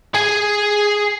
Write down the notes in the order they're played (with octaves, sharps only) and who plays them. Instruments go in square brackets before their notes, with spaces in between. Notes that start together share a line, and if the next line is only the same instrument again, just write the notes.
[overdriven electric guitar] G#4 G#5